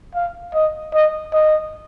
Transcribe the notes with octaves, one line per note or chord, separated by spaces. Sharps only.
F5
D#5
D#5
D#5